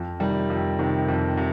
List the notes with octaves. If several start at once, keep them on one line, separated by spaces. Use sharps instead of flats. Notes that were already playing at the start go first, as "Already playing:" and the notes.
Already playing: F2
C3 D#3 G3
F2
C3 D#3
F2
C3